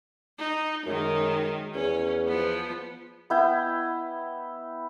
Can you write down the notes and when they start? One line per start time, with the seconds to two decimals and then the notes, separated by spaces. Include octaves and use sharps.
0.38 D#4
0.86 F#2 D#3 G#3
1.75 E2 C#4
2.27 F3 B3
3.30 B3 E4 G5